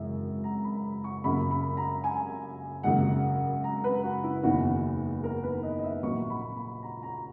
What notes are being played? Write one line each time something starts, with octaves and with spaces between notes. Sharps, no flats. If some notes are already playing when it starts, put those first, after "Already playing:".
Already playing: G#1 F#2 C#3 E3 G#3
A#5
B5
C#6
F#2 C#3 F#3 A#3 B5
B5
A#5
G#5
G#1 F#2 C#3 F#3 A#3 F#5
A#5
B4
F#4
E4
F#1 E2 D#3 F#4
A#4
B4
D#5
D#5
E5
A#1 A#2 F#3 A#3 C#6
B5
B5
A#5
A#5